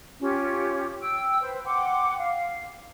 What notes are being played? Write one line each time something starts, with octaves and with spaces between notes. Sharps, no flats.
C#4 F4 G4
G5 E6
B4 C5
F#5 G5 C6 D6
F5